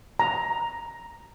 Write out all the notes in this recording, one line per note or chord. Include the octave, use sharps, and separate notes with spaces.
A#5